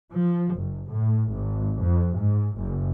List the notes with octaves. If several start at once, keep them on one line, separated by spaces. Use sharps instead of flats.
F3
F#1
A2
G#1
F2
G#2
F#1